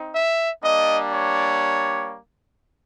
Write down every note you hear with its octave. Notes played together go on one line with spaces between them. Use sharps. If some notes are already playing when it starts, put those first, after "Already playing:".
Already playing: C4 D#4
E5
G3 A#3 D4 D#5
C#5